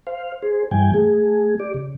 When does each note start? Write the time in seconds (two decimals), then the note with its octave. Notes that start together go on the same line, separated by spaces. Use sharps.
0.07 C5 F5
0.42 G#4 C5
0.71 G2 E3 G3 G5 G#5
0.94 A3 G#4
1.60 G4 D5
1.74 C#3